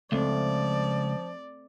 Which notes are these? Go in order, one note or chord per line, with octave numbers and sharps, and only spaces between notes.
C#2 F3 A3 C4 D5